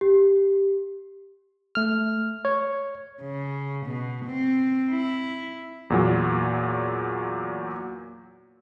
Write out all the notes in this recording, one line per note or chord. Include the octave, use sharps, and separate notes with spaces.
G4
A3 F6
C#5
C#3
B2
C4
E4
E2 A#2 F#3